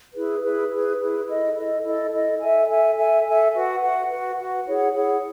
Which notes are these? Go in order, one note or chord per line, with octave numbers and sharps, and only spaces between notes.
E4 G#4 B4
E4 G#4 B4
E4 G#4 B4
E4 G#4 B4
E4 A4 D#5
E4 A4 D#5
E4 A4 D#5
E4 A4 D#5
A4 E5 G#5
A4 E5 G#5
A4 E5 G#5
A4 E5 G#5
F#4 B4 F#5
F#4 B4 F#5
F#4 B4 F#5
F#4 B4 F#5
E4 G#4 C#5 F#5
E4 G#4 C#5 F#5